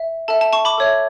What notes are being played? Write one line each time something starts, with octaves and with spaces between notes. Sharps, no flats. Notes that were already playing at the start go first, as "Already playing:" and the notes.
Already playing: E5
A4 E5 A5
A5
A5 C#6
B5 D6
A4 C#5 E5